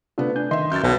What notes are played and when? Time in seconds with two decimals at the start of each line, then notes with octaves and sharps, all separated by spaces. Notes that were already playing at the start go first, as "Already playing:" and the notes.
0.18 C3 A3 B3 D4 F4
0.36 D4 G#5 G6
0.51 D#3 D#5 E5 C6
0.72 F#2 E5 G6 A6
0.84 B1 B2